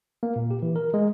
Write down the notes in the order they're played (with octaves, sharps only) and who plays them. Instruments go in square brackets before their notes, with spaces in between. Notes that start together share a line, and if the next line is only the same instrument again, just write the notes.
[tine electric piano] A#3
A#2
G4
E3
A#4
G#3